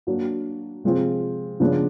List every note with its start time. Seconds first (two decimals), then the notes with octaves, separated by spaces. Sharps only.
0.07 F#3 A#3 D4 F#4
0.84 C3 F3 G#3 C4 F4
1.60 C#3 F3 G#3 B3 D4